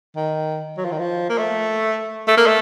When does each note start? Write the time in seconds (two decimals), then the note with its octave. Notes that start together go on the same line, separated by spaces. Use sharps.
0.16 D#3
0.77 F#3
0.85 F3
0.92 D#3
0.99 F3
1.29 A#3
1.38 A3
2.28 A3
2.37 A#3
2.46 A3